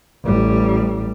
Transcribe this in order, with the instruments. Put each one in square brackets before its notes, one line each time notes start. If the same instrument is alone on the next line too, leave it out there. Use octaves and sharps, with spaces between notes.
[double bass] A1 G3